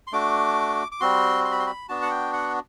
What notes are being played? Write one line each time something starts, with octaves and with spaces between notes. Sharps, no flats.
C6
A3 D4 F#4 D6
D6
G3 C4 F#4 C6
C6
B5
C6
B5
B3 D4 F#4 A5
F#5
G5
F#5